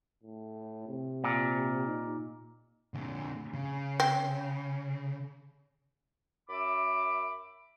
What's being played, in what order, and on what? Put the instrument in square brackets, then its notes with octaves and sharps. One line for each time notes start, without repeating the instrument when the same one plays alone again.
[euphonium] A2
C3
[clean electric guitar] A#2
[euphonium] D#4
[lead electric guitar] A#2 D3
C#3
[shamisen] C4
[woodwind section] F#2 E5 B5 D6